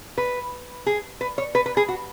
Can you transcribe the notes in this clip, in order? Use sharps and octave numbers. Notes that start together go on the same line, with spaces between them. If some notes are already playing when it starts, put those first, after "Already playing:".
B4
G#4
B4
C#5
B4
B4
G#4
F#4